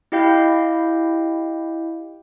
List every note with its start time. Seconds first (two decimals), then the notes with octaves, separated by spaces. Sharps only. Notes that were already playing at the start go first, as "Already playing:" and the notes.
0.12 E4 G4 D#5 F5 G5 G6